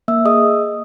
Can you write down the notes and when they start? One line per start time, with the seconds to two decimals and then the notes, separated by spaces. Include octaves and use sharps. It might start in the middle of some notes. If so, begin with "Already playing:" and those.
0.08 A#3 E5 E6
0.25 G#4 D#5 D#6